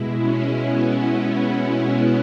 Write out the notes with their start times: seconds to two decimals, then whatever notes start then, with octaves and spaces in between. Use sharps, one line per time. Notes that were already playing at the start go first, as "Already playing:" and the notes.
Already playing: B2 G#3 E4
0.20 C#4
0.64 B3